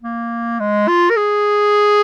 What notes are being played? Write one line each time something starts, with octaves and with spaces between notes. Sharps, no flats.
A#3
G#3
F4
A#4
G#4